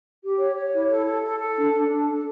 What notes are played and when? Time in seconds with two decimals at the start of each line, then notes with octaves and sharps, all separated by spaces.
0.22 G4
0.39 C#5
0.56 C#5
0.73 E4
0.90 A4
1.06 A4
1.22 A4
1.39 A4
1.56 D4
1.73 D4
1.89 D4
2.06 A4